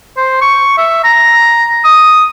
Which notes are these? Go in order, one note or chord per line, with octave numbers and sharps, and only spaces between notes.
C5
C#6
E5
A#5
D#6